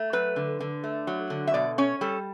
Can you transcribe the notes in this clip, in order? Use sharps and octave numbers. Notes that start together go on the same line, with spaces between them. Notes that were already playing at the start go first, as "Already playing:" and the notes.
Already playing: A3
F#3 B4
D3
D3
A3
F#3
D3
E5
B2 D5
C#4 C#5
G3 A4